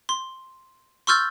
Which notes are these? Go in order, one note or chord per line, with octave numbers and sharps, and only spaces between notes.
C6
C6 C#6 E6 F6 G6 A6